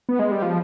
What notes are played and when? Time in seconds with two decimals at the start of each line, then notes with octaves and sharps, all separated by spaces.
0.09 B3
0.19 G#3
0.31 G3
0.42 F3